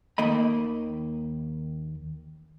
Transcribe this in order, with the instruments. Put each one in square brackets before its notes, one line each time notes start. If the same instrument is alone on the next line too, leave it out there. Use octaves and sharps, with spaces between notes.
[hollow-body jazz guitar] D#2 D#3 A#3 D#5 B5